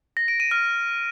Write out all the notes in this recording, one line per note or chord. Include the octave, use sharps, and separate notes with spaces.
A#6
D7
D#7
F6